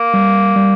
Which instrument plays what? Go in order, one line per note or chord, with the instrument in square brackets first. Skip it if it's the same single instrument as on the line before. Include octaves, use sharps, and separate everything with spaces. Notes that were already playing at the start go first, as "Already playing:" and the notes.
Already playing: [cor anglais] A#3
[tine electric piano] G3
G3